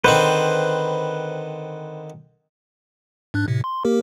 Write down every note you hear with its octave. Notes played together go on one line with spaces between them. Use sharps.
D3 D#3 C4 B4 C5
G#2 D4 F#6
A2 C3
C6
A#3 G4 A#4